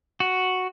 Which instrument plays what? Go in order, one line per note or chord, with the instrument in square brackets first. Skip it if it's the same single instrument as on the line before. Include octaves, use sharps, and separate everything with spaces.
[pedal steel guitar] F#4